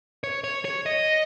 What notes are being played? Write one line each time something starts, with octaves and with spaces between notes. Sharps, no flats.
C#5
C#5
C#5
D#5